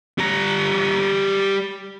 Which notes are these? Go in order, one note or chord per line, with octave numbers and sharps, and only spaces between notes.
G3 A#5